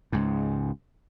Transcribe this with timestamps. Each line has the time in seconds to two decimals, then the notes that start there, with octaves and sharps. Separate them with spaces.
0.12 C#2 G#2